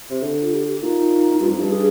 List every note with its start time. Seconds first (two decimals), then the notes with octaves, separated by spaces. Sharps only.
0.11 C3
0.22 D3
0.42 F4
0.52 G4
0.67 G4
0.81 A#2 D#4
1.40 G2 F4
1.49 F2 D#4
1.60 G2 D4
1.70 G#4